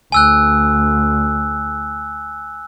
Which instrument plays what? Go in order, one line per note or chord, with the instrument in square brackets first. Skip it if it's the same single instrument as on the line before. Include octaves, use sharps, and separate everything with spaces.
[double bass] D2 [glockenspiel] G#5 E6 F#6